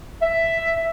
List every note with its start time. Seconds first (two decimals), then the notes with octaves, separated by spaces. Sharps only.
0.22 E5